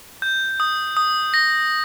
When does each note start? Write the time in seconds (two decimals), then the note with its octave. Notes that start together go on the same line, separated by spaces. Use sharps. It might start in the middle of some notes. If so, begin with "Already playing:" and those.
0.22 G6
0.60 D#6
0.97 D#6
1.34 A#6